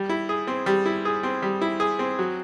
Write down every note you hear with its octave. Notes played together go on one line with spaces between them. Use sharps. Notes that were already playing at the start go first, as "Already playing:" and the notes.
Already playing: G3
E4
G#4
C4
G3
E4
G#4
C4
G3
E4
G#4
C4
F#3